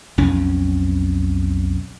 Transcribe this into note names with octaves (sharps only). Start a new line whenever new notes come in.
B1 F2 C#4